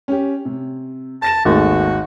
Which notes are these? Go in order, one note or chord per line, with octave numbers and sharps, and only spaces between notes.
C#4 G4
C3
A5 A6 A#6 E7
G#1 D#2 A3 F#4 G#4